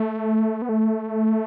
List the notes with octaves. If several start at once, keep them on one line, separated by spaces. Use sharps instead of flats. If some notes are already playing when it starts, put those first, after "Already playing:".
Already playing: A3
B3
A3